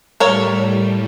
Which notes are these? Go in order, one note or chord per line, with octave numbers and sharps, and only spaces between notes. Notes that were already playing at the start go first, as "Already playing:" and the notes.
A2 G3 A4 A#4 C#5